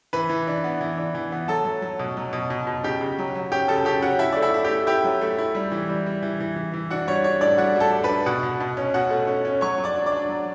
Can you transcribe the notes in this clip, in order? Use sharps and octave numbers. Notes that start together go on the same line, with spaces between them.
E3 B4 B5
E3
D4
B3
E3
D4
E3
B3
F#3 A4 A5
F#3
F#3
B2
F#3
B2
B2
B2
C#3 G4 G5
C#3
F#3
F#3
C#4 G4 G5
C#3 A4 A5
C#3 G4 G5
C#4 F#4 F#5
E4 E5
A3 D5
E4 E5
E4
G4 G5
A3
E4 G4 G5
F#3
A3
E4
G3
E3
G3
G3
E3
E3
E3
E3
D4 F#4 F#5
G3 C#5
D4 C#5
A2 D4 D5
G3 F#4 F#5
G3 A4 A5
D4
B4 B5
D4
B2 F#4 F#5
B2
B2
C#4
B2 F#4 F#5
A3
C#4
C#4
F#3 C#5 C#6
F#3
D5 D6
D4
D5 D6
D4
F#3